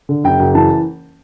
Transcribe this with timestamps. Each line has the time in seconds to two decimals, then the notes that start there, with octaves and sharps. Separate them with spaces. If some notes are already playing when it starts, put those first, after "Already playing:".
0.09 D3
0.24 F#1 G5
0.40 F#1
0.55 E3 A5